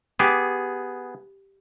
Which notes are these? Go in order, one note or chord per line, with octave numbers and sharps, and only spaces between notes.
B3 G4 G#4